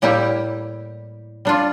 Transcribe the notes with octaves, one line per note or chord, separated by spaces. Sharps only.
A2 G3 A#3 E4 G4
G3 D4 F4